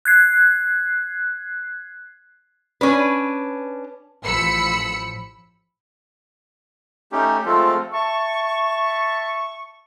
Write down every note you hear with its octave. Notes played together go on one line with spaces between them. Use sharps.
F#6 G#6 C7
C#4 D4 B4
A1 F3 B5 E6 C#7
A3 C#4 D#4 G4
F3 G#3 A3 C4 F4 A4
E5 A5 C#6